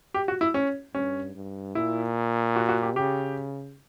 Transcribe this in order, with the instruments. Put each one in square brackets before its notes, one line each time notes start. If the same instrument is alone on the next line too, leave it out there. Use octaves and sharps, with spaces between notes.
[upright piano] G4
F#4
E4
C#4
[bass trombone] G2 [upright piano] C#4
[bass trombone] G2
[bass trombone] A#2 [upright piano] E4
[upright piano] F#4
F#4
G4
[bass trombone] C#3 [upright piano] G4